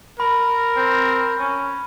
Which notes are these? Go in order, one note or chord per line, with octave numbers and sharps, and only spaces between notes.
A#4 B5
C4
C#4